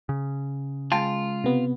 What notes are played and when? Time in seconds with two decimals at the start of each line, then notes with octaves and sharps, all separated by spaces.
0.09 C#3
0.92 G#3 F4 G5 A5
1.44 C3 B3